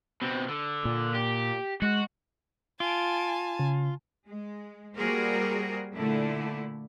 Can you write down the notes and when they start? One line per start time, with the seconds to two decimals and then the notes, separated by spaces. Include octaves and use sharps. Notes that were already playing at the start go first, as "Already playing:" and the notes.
0.22 B2 C4
0.48 D3
0.85 A#2
1.15 G4
1.82 G#3 F#4
2.80 F4 G#5 A5 D7
3.59 C#3
4.26 G#3
4.96 G3 A#3 F#4 G#4 A#4 C5
5.94 A#2 D3 A3 E4